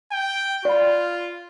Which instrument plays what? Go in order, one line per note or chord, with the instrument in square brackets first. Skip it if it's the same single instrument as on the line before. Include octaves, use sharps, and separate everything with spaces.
[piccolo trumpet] G5
[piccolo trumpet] F4 [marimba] D5 B5